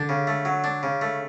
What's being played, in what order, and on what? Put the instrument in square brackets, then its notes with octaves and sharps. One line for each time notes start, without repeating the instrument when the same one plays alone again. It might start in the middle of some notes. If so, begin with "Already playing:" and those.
Already playing: [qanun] D3 [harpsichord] D4
[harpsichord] C#3
A3
F#3
D4
C#3
A3